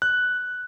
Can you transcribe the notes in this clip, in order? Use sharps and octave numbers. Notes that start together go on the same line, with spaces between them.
F#6